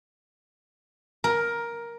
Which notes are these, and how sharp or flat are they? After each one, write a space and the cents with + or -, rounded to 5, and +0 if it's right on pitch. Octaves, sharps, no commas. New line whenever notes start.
A#4 +10